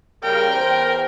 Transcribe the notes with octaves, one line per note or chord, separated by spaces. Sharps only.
A#2 C#3 G3 A#4 G5
E2 C5